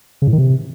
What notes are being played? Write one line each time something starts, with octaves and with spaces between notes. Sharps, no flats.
C#3
A2
D#3
C3